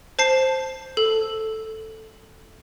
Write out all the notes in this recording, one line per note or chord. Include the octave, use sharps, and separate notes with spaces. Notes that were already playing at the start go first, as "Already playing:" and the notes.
C5 A5 C7
A4